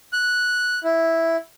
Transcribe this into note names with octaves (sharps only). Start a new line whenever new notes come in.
F#6
E4